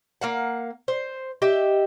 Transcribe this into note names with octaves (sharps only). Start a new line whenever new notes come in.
A#3 F5 F#5
C5
G4 D#5 E5